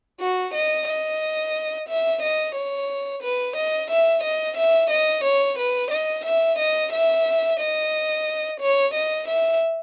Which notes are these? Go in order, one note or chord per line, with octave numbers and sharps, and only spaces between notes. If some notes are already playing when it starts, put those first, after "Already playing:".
F#4
D#5
D#5
E5
D#5
C#5
B4
D#5
E5
D#5
E5
D#5
C#5
B4
D#5
E5
D#5
E5
D#5
C#5
D#5
E5